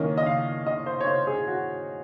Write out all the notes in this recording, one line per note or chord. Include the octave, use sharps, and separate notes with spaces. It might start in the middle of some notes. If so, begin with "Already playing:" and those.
Already playing: D#3 A#3 C#4 D#5
D#5
F5
D#5
C5
C#5
C5
G#4
F#4